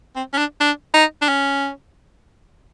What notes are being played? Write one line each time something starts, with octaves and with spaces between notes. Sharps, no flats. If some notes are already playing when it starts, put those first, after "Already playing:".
C4
C#4
D4
D4
D#4
D4
C#4